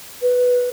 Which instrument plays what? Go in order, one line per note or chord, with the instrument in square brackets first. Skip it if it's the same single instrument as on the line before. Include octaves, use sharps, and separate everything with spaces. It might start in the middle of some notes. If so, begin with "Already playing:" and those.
[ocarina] B4